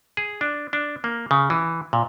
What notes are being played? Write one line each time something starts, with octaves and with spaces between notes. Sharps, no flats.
G#4
D4
D4
A#3
C#3
E3
A#2